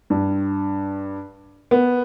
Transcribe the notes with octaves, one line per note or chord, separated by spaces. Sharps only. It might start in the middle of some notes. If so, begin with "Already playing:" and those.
G2
B3